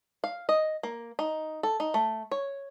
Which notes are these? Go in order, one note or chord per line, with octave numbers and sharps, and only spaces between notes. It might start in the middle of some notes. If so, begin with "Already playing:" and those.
F5
D#5
A#3
D#4
A4
D#4
A3
C#5